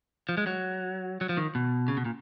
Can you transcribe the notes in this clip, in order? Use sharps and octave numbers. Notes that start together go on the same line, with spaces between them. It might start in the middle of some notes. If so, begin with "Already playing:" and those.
F3
G#3
F#3
F#3
F3
D#3
B2
C#3
B2
A#2